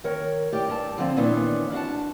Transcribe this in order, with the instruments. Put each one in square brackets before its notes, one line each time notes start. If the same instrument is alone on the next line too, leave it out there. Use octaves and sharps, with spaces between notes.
[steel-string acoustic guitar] D#3 A#4 C#5
A2 G4 D5
G2 A#4 A5
D3 F3 C4
A#2 D#3 E3 B3 D4 C#5
D4 F#4 F5 F#5 A5